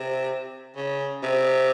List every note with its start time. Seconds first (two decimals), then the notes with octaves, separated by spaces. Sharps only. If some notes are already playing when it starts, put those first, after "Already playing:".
Already playing: C3
0.76 C#3
1.23 C3